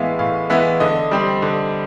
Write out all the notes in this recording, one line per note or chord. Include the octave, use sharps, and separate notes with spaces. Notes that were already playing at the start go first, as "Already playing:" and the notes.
Already playing: A2 E3 G#3 B3 E5 F5
A2 F5
E3 G#3 B3 E5
D3 D#5
G3 C4
D3